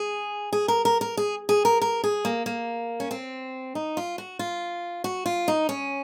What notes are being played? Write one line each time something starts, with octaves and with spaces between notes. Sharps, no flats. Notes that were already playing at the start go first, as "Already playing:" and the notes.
Already playing: G#4
G#4
A#4
A#4
A#4
G#4
G#4
A#4
A#4
G#4
A#3
A#3
C#4
C4
D#4
F4
F#4
F4
F#4
F4
D#4
C#4